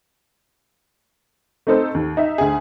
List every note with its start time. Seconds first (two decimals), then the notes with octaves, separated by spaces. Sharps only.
1.67 A3 C4 D#4 A4 C5
1.94 D#2
2.17 D#4 E5
2.38 D2 G#4